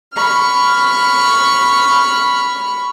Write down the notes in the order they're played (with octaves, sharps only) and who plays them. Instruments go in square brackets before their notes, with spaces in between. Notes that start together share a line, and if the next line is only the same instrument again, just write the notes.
[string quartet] B5 C#6 F6